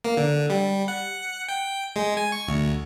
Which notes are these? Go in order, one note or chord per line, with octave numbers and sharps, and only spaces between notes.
A#3
D3
G3
F#5
G5
G#3
G#5
C#6
D2